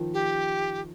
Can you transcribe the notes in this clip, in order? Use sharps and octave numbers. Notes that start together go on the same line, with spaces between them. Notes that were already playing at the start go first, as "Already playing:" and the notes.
Already playing: D#3 F3
G4